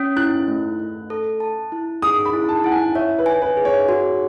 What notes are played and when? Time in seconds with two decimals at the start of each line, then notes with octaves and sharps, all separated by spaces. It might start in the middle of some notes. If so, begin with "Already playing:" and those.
Already playing: C#4
0.17 E4 F#6
0.48 A3
0.79 A3
1.10 A4
1.40 A5
1.72 E4
2.02 G#4 D#6
2.25 B5
2.33 E4
2.49 A5
2.64 E4 F#5
2.72 G#5
2.95 C#5 E5
3.18 B4
3.26 G#5
3.42 B4
3.57 G#4
3.65 C#5
3.89 F#4